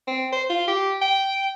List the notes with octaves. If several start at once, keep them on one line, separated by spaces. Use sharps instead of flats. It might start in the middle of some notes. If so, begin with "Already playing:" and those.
C4
C5
F4
G4
G5